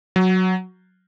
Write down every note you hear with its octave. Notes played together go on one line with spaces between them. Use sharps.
F#3